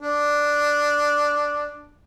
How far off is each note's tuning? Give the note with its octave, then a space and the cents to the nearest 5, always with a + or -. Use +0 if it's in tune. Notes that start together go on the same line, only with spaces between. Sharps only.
D4 +0